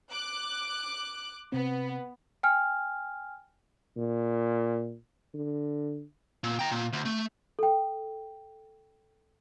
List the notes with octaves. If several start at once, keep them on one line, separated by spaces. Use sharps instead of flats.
D6 F#6
C3 B3 C4
G5 G#5 F6
A#2
D3
A#2
G5 A#5
A#2
D2
A3
A4 G5